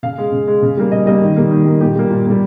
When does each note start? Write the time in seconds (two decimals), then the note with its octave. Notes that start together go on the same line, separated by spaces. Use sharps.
0.03 C#3 F5
0.18 G#3
0.32 C#3
0.48 G#3
0.62 C#3
0.77 G3 A#3
0.92 C#3 D#5
1.06 G3 A#3 D#5
1.21 D#3
1.36 G3 A#3
1.51 D#3
1.65 G3 A#3
1.81 A#2 G4
1.96 G3 A#3
2.10 A#2
2.25 G3 A#3